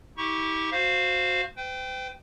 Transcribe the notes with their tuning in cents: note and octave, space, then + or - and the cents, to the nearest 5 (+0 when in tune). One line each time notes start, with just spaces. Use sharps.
E4 -45 G4 +0 C#6 +0
F#4 -15 C5 +0 F5 +0
C5 -45 G5 +0